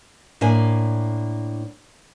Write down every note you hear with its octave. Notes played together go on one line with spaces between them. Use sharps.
A2 A#3 D4 G#5